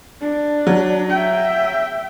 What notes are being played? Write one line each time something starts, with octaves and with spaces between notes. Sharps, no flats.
D4
F#3
E5 G5